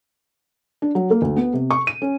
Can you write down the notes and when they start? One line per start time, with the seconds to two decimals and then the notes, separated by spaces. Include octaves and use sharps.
0.82 D4
0.95 F#3
1.10 A#3
1.22 D2
1.36 B3
1.53 C3
1.71 C#6
1.87 D#7
2.02 C#4